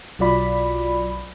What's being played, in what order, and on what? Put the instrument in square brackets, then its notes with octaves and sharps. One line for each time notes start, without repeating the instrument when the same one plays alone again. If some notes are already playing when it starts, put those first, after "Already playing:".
[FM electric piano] B1 F#3 F4 D5 B5